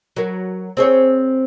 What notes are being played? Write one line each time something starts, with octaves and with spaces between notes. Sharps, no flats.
F#3 A#4
C4 G#4 C#5